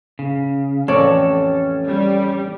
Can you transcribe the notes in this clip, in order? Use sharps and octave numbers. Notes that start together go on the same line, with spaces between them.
C#3
A1 F2 C#4 A4 C#5 D5
G3